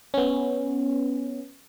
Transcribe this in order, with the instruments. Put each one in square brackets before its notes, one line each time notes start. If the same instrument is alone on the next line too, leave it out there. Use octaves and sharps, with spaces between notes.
[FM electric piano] B3 C#4